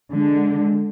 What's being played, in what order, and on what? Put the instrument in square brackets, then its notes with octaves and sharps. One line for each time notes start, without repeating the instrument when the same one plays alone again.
[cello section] D3 G#3